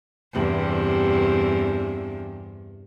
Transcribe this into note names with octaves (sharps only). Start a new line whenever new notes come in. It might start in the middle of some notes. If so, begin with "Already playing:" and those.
E2 G2 C3